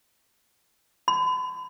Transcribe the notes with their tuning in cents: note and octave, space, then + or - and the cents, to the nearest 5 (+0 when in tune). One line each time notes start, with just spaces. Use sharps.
B5 +40